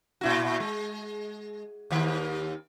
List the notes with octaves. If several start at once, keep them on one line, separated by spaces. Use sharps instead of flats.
A#2 E4 F#4
G#3
D#2 D#3